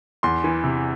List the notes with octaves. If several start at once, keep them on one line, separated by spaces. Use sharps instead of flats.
E2 C6
E3
C3